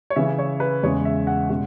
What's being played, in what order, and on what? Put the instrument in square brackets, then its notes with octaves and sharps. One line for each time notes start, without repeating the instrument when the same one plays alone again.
[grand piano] C#5
C#3 E3 C#4 E5
C#5
B4
E2 C#3 G#3 C#4 C#5
E5
F#5
B2 G#3 C#4 F#5